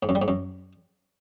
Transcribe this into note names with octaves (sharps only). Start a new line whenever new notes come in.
G#2
F#2
G3
G#2
F#2